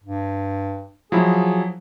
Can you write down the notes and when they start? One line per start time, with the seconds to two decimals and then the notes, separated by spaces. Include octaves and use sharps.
0.04 G2
1.12 F3 F#3 E4 G#4